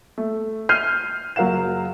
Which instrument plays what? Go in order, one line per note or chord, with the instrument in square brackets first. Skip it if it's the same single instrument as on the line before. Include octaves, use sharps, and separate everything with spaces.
[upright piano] A3
F6 G6 C7 D#7
F#1 F#3 A#4 F5 F#5 E7